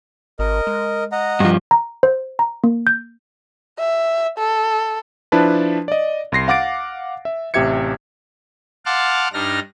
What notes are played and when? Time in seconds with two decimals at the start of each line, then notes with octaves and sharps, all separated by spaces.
0.39 G#1 A#4 D#5
0.67 G#3
1.12 D#5 F#5 A#5
1.40 G2 F3
1.71 A#5
2.03 C5
2.39 A#5
2.64 A#3
2.87 G6
3.79 E5
4.38 A4
5.32 F3 D4 E4 B4 A5
5.88 D5 D#5
6.32 C2 C6 A#6 C7
6.48 F5 F#5 D6 A6 D7
7.25 E5
7.54 A1 C3 G4 E5 G#6 C#7
8.86 F5 F#5 A5 C6 D6 F6
9.33 G2 D4 D#4 F6 A#6